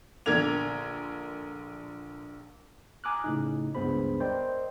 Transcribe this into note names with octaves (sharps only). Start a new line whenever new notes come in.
A#1 D3 A#4 G#6 F7
G#5 A#5 D6 D#6 F6 F#6
A2 C#3 D#4
C#2 G2 B3 G#4 C5 B5
A#4 C5 D5 D#5 G5